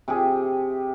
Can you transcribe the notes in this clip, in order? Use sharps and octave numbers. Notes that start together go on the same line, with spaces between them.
C3 G4 G#4